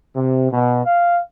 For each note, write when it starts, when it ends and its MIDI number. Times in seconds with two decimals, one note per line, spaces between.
0.16 0.48 48
0.51 0.83 47
0.85 1.18 77